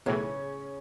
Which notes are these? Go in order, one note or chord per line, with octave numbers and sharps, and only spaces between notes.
B1 A2 C#3 E3 C#4